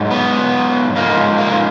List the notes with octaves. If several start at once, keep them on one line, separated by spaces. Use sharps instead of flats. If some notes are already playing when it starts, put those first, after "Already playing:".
Already playing: G#2 F#3
B3
G#2 F3 A#3
A#3